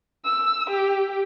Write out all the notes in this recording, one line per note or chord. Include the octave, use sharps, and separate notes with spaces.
E6
G4